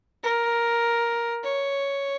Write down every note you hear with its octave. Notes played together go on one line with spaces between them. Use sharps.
A#4
C#5